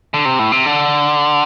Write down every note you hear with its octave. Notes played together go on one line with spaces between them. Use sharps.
D3
C3
A2
C3
D3